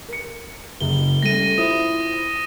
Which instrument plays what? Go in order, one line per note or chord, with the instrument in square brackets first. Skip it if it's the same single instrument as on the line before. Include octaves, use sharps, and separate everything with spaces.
[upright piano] A#4 C#7
[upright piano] F#1 [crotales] G7
[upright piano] G3 A3 C#4 [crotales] A#6 D#7
[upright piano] E4 F4 C5 [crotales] D#6